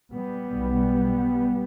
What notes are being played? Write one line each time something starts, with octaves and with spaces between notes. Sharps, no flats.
G3 B3
B1 B2